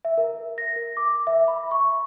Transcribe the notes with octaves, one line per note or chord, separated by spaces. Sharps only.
E5
A#4
A#6
A#4
D6
E5
B5
C#6